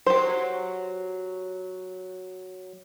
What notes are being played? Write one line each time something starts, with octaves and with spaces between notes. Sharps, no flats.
F#3 G4 C5